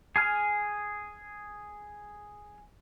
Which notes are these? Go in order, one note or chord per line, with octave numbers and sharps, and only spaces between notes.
G#4 G#5 F6